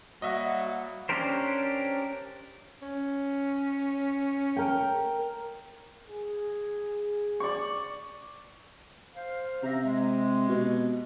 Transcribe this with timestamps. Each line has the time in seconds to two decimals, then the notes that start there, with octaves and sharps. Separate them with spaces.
0.22 F#3 G3 A#3 F#4 D#5 E5
1.09 C#4 D4 G4 A#4 C5
2.82 C#4
4.57 A#4 G5
6.07 G#4
7.40 D5 C#6
9.16 C5 F5
9.63 C3 E5 A#5
9.84 G#3
10.49 B2